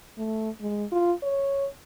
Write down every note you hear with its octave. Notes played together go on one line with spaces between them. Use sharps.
A3
G#3
F4
C#5